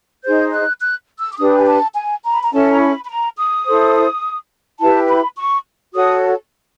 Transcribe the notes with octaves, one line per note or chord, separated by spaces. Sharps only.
D#4 G#4 C5 G6
F#6
F#6
E6
D6
D4 G4 B4 D#6
G#5
A5
G#5
A#5
B5
A#5
C#4 E4 A4 A5
A#5
B5
B5
A#5
D#6
E4 A4 C5
E4 G4 B4 A5
B5
C#6
F#4 A4 C#5 D#6